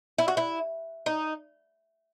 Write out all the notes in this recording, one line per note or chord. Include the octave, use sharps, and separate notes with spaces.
E4
F#4
E4
D#4